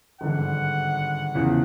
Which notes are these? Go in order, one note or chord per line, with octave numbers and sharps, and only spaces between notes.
G#1 G2 D3 F#5
E2 C#3 F3